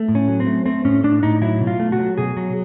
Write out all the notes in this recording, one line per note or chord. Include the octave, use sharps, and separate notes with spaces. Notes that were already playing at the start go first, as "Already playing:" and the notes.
Already playing: A3
A2
C#4
F#3
C4
A3
A3 C4
A2 C#4
A2 D4
A2 D#4
F#3 E4
B2
F4
A3
F#4
F#3
B2 G#4
F#3